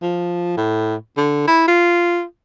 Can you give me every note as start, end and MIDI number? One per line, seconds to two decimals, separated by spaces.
0.03 0.52 53
0.57 0.95 45
1.18 1.45 50
1.48 1.68 64
1.68 2.23 65